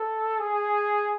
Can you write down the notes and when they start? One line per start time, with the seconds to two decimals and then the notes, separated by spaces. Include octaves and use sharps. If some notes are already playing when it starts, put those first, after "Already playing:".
Already playing: A4
0.39 G#4